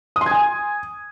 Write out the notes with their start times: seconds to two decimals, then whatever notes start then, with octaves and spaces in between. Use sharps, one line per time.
0.16 D#6
0.21 C6
0.26 G#6
0.31 G#5